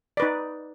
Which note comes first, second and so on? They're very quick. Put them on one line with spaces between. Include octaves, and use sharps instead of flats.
D5 B4 D#4